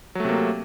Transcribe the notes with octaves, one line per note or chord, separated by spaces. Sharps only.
C3 F#3 A3 A#3